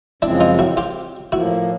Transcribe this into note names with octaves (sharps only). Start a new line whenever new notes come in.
F#2 C#3 F3 G#3 C4 D4 E4
D#4 F4
E4 F#4
F4 G4
A2 F3 A#3 E4 F#4